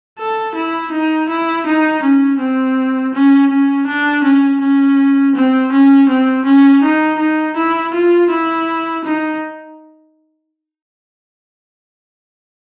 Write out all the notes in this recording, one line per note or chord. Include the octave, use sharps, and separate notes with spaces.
A4
E4
D#4
E4
D#4
C#4
C4
C#4
C#4
D4
C#4
C#4
C4
C#4
C4
C#4
D#4
D#4
E4
F4
E4
D#4